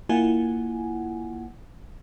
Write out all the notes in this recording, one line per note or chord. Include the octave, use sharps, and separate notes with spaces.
A#3 E4 F4 F#5 G#5